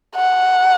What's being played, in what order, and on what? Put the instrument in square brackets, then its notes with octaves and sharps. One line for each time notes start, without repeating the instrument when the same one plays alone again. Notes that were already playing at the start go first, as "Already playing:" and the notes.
[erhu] F#5